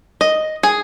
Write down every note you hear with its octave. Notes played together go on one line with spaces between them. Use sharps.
D#5
G#4